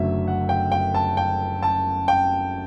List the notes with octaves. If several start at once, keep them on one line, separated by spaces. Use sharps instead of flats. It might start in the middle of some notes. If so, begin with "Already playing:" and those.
Already playing: F#1 F#2 D3 F#3 A3 E5
F#5
G5
G5
A5
G5
A5
G5